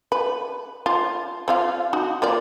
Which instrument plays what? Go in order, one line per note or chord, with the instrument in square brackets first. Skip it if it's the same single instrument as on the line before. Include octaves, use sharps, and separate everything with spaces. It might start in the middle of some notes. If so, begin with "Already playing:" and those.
[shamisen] B4
F4
C4 F4 F5
D#4 F#4
A#3 F4 D5